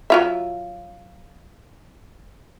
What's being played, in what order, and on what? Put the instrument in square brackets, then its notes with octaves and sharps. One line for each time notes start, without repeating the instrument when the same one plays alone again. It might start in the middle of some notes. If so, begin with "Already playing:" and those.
[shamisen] F#3 F4 E5